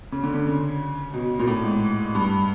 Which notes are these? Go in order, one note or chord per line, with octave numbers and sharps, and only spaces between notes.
C#3
D3
D3
C#3
B2
A#2
A2
G#2
G2